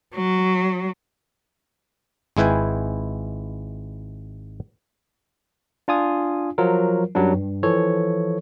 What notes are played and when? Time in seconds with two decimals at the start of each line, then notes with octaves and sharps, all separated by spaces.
0.15 F#3
2.37 G#1 G#3 E4 B4 G5 G#5
5.88 D4 F4 G#5 D#6
6.58 F3 F#3 F4 A#4
7.15 F#2 F#3 G3 D4
7.34 G2
7.63 E3 F3 A4 C#5